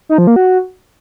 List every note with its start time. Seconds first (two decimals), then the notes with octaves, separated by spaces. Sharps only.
0.09 D#4
0.18 F3
0.27 A#3
0.36 F#4